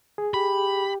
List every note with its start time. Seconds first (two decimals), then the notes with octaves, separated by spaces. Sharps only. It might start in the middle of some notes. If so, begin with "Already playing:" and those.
0.18 G#4
0.34 G4 B5